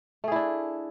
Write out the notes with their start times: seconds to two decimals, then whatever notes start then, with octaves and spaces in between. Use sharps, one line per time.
0.24 A3
0.28 G#4
0.32 E4
0.36 D4